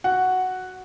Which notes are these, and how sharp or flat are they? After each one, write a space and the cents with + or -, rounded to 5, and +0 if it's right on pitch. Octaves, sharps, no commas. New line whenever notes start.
F#4 +0 F#5 +0